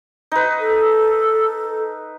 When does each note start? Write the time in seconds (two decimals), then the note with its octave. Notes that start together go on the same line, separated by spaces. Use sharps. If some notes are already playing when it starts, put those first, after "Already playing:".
0.32 D#4 B4
0.60 A4